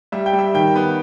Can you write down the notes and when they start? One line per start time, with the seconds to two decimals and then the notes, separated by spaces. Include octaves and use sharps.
0.12 G3 E5
0.26 G5
0.33 G3
0.39 E5
0.54 D#3 G5
0.75 B3